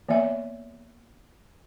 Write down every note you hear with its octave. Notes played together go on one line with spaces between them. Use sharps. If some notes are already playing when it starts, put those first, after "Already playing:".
E3 A#3 B3 D5 E5